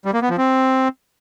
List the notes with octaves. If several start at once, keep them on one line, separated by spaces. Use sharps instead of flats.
G3
A#3
B3
F3
C4